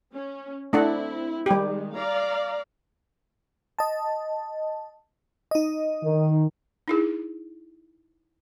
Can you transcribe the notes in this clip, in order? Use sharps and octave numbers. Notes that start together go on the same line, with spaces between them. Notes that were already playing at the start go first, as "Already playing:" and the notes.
C#4
A3 C4 D4 E4 F#5
D#3 G3 G#3 G4
D5 F5 A#5
D#5 A5
D#4 D#5
D#3
D#4 E4 G#4